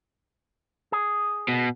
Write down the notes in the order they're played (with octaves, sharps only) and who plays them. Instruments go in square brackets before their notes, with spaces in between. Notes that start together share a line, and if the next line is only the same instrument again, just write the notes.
[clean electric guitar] G#4
[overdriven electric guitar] B2